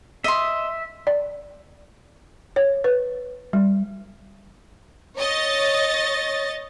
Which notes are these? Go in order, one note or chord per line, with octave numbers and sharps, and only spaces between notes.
D#5 E5 C6
D5
C#5
B4
G3
C#5 D#5 A6